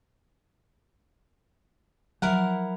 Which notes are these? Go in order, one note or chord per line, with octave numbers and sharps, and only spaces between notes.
F3 F#3 E4 A#4 F#5